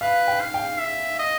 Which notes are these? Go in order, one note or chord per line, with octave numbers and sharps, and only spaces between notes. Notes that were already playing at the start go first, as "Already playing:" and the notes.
B4 F5
G5
F5
G5
E5
D#5